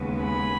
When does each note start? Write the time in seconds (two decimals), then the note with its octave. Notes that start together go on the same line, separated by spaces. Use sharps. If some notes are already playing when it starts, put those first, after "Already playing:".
Already playing: D#2 C#3 G#3 B3
0.24 G#5 B5